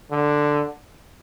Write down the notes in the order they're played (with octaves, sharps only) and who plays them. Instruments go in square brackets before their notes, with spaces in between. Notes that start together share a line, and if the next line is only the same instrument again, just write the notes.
[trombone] D3